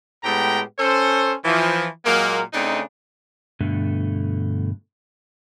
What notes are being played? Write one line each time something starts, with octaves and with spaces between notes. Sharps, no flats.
A2 G#3 B3 G4 G5 A#5
C#4 A4 C5
E3 F3
A#2 F#3 G#3 A#3
C#3 A3 C4 D4 D#4
G2 B2 D3 A3